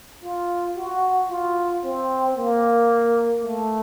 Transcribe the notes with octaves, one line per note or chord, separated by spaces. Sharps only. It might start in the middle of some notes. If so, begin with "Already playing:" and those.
F4
F#4
F4
C4
A#3
A3